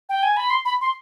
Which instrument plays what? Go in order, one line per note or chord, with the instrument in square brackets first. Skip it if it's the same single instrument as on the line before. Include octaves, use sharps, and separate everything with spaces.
[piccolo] G5
G#5
B5
C6
B5
C6